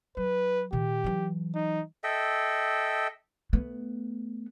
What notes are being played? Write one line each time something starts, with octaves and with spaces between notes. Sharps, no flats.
F#3 B4
A#2 D#3 G4
E3 F#3
D#4
A4 D#5 E5 G5
A3 B3